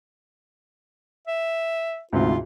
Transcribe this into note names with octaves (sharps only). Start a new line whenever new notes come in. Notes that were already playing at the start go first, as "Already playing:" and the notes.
E5
D2 G#2 C3 F4